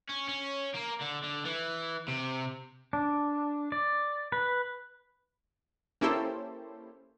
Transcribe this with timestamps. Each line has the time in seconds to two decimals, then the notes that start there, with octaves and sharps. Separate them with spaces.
0.09 C#4
0.28 C#4
0.74 A#3
1.01 D3
1.23 D3
1.45 E3
2.08 C3
2.93 D4
3.72 D5
4.32 B4
6.01 A#3 C#4 E4 G4 A4 C5